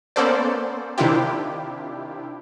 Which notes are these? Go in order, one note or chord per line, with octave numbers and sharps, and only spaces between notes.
A#3 B3 C#4 A4 C5 D5
C3 D#3 D4 E4 F4 G4